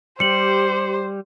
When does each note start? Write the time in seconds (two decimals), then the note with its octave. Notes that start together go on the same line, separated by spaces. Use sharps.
0.20 G3 G4 C5 C#7 F#7